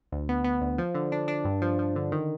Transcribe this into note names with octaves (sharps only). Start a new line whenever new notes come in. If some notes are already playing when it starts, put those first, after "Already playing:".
D2
B3
B3
D2
F3
D3
D4
D4
G2
F3
F3
D3
D#3